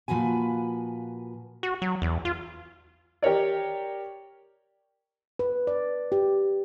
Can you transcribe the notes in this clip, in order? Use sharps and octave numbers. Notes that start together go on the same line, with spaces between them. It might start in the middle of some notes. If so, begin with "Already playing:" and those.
A#2 F3 F#4 B4 G#5
F#4
F#3
E2
F4
G4 A#4 C#5 D5
B4
D5
G4